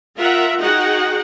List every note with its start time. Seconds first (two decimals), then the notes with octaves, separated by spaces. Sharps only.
0.18 F4 A#4 E5 F#5
0.62 D#4 F#4 G#4 F#5 G5